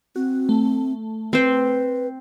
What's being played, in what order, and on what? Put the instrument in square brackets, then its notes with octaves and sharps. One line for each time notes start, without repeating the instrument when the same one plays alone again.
[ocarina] C4 [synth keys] F#4
[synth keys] A3
[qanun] C4 C5 [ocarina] B4